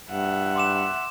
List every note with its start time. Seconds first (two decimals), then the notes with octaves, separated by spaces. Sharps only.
0.11 G2 E5 F#5
0.56 C6 D6 E7